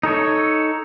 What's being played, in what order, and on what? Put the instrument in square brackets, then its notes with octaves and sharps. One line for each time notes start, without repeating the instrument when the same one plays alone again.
[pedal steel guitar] D#4 A4 C#5